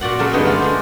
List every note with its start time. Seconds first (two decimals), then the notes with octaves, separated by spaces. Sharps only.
0.01 A#2 F#4 D5 F#5
0.19 C#3 F#3 A4 A#4 C#5
0.33 G2 D3 G#3 B3 D#4
0.45 A3 F4
0.60 G#3 D4 C5